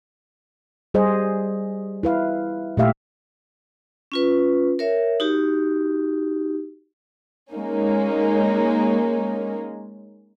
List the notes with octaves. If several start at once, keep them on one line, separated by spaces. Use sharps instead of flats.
G3 G#4 C5 D#5
E4 B4 F5
A#2 A3 G4 E5 F5
C#4 F4 B4
A#4 C#5 E5
D#4 F#4 G4
G#3 A#3 C#4 D#4